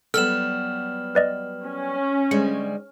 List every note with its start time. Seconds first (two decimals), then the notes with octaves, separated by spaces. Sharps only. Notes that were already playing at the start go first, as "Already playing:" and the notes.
0.14 F#3 G3 B3 A4 F6 E7
1.15 B4 D5 D#5
1.66 C#4
2.31 D2 G3 G#3 C#7